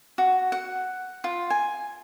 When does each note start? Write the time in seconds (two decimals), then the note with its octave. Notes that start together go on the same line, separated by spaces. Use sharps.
0.18 F#4
0.52 F#5
1.24 F4
1.50 G#5